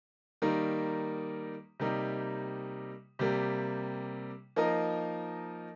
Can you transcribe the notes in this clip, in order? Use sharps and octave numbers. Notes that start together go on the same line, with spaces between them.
D#3 G3 A#3 D#4
C3 G3 A#3 D#4
C3 G3 A#3
F3 A#3 D#4 A#4 D#5